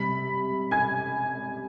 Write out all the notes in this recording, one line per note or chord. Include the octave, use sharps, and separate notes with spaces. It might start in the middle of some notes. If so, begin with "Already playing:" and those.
Already playing: C3 G3 B5 B6
G#5 G#6